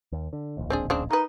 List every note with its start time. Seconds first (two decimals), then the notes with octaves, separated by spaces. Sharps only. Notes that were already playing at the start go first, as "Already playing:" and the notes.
0.12 D#2
0.33 D3
0.57 D1 A#1 D#2
0.70 C4 D4 G#4
0.90 C#3 C4 D4
1.11 D#3 D#4 B4